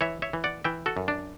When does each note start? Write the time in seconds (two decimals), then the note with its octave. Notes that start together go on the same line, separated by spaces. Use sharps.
0.01 E3 C#5 E5
0.22 C#5 E5
0.33 E3
0.44 D5 F#5
0.64 E3 E5 G5
0.86 F#4 A4
0.97 F#2
1.08 D4